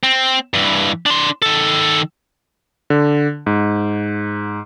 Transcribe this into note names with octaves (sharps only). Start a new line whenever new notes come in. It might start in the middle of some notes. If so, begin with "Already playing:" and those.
C4
G2 E3
D4 C6
D#3 A4
D3
G#2